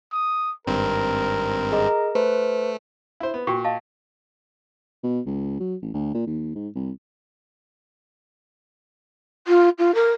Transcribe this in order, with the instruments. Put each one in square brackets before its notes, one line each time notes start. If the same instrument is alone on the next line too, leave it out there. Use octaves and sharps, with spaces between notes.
[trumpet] D#6
[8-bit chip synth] G#1 G2 C4 [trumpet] A#4
[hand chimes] G#4 D#5 A#5
[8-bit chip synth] A3 [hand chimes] B4 C5
[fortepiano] E4 C5
B3
[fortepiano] A#2 [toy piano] F#4 G5 C#6
[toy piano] D#5 F5 A5
[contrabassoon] B2
C#2
F#3
A1
D2
A#2
D#2
G#2
C2
[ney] F4
F4
A#4